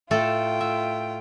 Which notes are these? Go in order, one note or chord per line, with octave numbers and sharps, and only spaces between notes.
A2 A3 F4 A4 G5
E5